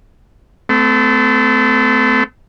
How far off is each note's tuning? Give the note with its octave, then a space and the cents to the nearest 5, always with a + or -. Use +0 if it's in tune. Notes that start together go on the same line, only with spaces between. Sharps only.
A3 +0 C4 -40